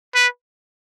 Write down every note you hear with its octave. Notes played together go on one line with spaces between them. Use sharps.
B4